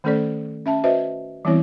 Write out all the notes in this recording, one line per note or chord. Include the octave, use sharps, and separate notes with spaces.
D#3 A3 C#4 A4 C5 D5
C#4 E5 A5
F#4 B4 C5 D#5 E5
E3 G3 B3 C4 E4 C#5